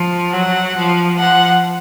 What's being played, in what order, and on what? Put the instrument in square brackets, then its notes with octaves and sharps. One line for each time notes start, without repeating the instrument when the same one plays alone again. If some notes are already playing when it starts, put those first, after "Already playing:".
Already playing: [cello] F3
[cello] F#3 [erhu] F#5
[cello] F3
[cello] F3 [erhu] F#5